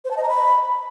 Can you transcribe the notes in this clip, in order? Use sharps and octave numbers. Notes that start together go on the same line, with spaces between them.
C5
A5
D#5
A#5
B5